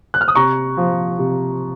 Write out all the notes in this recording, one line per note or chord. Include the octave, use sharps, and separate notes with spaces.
F#6
F6
D#6
C3 A#5 C#6
F3
C3